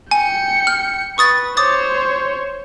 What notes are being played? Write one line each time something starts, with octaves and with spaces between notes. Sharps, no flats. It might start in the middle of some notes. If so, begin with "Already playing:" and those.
G5 G#5 C#7
F6
B4 C#6 D#6 A6
C5 C#5 D6 D#6 A6